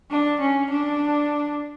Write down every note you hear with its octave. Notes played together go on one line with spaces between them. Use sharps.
D4
C#4
D4